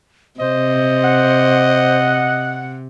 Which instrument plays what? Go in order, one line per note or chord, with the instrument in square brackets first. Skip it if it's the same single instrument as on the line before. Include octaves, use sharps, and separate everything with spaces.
[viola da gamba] C3 [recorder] C5 [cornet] D#5
[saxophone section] F#5